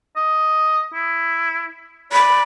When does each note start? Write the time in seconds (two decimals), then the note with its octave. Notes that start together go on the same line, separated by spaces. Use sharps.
0.17 D#5
0.93 E4
2.12 D5 B5